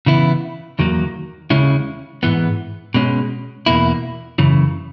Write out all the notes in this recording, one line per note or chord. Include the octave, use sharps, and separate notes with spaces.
C#3 E3 B3 E4
E2 D#3 F#3 A#3
D#2 C#3 G#3 C#4 E4
G#2 E3 B3
B2 G#3 C#4
E2 B2 A#3 E4
F#2 C#3 E3